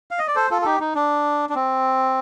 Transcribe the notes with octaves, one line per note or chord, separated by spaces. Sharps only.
F5
D#5
D5
A4 C5
F4 A4
A4
D#4 G4
D#4
D4
D4
C4